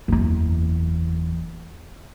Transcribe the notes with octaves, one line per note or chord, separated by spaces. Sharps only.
F#1 E2